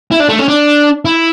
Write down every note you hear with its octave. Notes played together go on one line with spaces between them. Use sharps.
E4
D4
A3
C#4
D4
E4